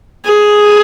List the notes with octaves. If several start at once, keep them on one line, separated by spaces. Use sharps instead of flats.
G#4